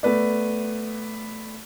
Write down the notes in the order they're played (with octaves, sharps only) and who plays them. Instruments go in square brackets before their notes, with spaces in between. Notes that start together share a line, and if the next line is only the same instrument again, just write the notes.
[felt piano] A3 B3 B4 D5